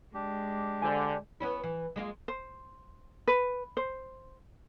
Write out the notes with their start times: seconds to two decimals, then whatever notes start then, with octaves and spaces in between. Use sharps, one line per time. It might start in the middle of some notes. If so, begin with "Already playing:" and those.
0.14 G#3 D4 G4
0.82 D3 C5 D5 G#5
1.40 B3 C#4 E4
1.64 E3
1.96 G#3 A#3 F4
2.28 C5
3.27 B4
3.77 C5